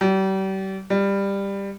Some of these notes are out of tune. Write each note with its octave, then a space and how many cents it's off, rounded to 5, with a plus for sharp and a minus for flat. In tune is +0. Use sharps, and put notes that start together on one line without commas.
G3 -35
G3 +15